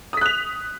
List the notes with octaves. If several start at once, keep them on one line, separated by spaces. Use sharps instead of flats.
D#6 F#6 B6 F7